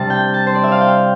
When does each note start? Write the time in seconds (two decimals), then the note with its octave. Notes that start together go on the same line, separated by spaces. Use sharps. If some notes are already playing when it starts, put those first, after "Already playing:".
Already playing: C3 G3 D4 A5
0.10 G5
0.34 A5
0.47 C5
0.55 D5
0.64 E5
0.72 F5
0.81 G5